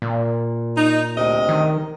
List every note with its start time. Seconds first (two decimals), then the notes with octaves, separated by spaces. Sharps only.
0.02 A#2
0.77 D#4
1.16 D2 C3 D#5
1.49 D#3